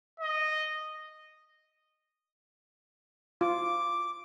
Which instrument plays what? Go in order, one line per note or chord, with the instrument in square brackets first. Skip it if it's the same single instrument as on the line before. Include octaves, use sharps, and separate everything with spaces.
[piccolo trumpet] D#5
[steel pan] F4 [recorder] D6